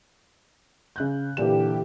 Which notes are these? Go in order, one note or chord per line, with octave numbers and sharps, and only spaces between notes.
C#3 F#6 G6
A#2 D3 E3 D4 G4 E7